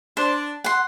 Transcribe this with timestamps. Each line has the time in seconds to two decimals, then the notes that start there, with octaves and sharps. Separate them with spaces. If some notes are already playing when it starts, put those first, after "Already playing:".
0.17 D4 C5
0.64 F#5 C6